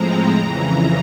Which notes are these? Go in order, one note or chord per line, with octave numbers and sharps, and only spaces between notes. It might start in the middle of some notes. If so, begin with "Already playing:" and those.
Already playing: A2 F3 G#3 C4 A#5
F2 C#3 E3